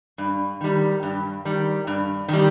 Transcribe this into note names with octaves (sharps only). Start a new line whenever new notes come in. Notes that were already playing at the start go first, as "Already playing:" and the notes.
G2
D#3 G3
G2
D#3 G3
G2
D#3 G3